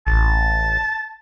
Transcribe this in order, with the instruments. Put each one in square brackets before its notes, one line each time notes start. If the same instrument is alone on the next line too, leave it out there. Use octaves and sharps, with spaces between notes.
[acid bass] A1 [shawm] A5